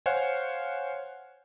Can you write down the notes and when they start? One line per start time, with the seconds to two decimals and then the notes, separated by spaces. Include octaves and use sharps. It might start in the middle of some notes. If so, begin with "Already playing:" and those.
0.06 C5 C#5 F5 F#5 G#5